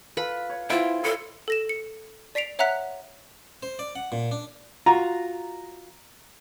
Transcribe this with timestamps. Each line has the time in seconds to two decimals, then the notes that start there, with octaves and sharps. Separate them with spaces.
0.17 F4 A4 B4 B5
0.49 C#5
0.70 B3 E4 F4 C5 E5 G5
1.03 E4 A4 C#5
1.48 A4 A#6 E7
1.69 C#7
2.35 D5 B6 C7 D7 F7
2.59 C#5 E5 F#5 A#5 F#6 B6
3.63 C5
3.79 D5
3.96 F#5
4.12 A#2
4.31 D4
4.86 F4 F#4 A#5